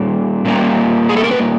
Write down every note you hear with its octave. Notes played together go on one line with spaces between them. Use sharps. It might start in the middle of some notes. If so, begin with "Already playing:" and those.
Already playing: A#2 G3 A#3
A#2 G3 A#3
G#4
A4
A#4
B4